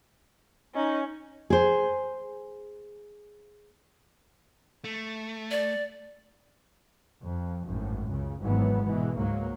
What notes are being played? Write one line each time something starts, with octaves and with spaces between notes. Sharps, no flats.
C#4 D#4
G#4 C5
A3
D5
F2
G#1 F#2 A2
C#2 C#3
G#1 G#2 E3 F#3 B3
B2 E3 G#3
C#2 G#2 F#3 A#3